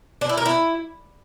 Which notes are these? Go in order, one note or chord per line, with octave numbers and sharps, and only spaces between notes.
D4
E4
A#4
E4